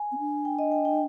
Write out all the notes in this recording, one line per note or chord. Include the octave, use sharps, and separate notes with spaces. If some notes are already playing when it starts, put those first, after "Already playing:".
Already playing: G#5
C4
D4
G5
D#5
G5
G5